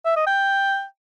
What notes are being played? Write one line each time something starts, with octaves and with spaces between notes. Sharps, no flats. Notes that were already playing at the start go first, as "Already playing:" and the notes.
E5
D#5
G5